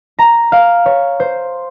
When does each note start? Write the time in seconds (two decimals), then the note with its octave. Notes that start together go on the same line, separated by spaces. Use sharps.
0.19 A#5
0.52 F5
0.86 C#5
1.20 C5